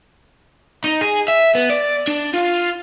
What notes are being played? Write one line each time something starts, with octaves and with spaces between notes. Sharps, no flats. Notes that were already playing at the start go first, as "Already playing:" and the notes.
D#4
G#4
E5
B3
D5
D4
F4